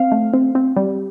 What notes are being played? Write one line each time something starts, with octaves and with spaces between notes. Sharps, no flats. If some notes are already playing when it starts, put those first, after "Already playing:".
Already playing: C4 F5
A3
C4
C4
G3